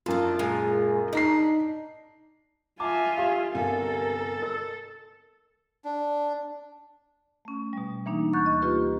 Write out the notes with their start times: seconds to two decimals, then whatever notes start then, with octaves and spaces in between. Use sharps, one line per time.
0.06 F#2 D4 F4 A4
0.39 A#2 G#3 G#5
1.13 D4 D#4 A#5 C7
2.80 F4 E5 G#5 A5 D6
3.17 G4 F5 C6 D#6
3.54 G1 C2 A4 A#4 G#5
4.42 A#4 E6
5.84 D4
7.45 A3 C#4
7.73 B2 G3
8.06 E3 A#3 D4 D#4
8.33 D2 C#6 F#6 G6 A6
8.46 D#5
8.62 A#3 F4 G4 B4